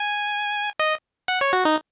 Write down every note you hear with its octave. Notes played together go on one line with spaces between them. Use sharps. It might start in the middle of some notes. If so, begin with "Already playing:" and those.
Already playing: G#5
D#5
F#5
C#5
F#4
D#4